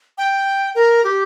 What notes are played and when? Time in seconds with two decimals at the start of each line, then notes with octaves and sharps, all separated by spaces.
0.18 G5
0.75 A#4
1.04 G4